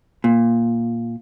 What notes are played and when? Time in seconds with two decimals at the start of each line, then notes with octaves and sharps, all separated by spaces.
0.24 A#2